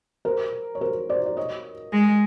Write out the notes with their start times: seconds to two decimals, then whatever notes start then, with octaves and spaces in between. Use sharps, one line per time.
0.25 A#4 C5
0.75 C#5
0.81 A#4 C5
1.09 C5 D5
1.26 D5
1.37 C#5 D#5
1.92 G#3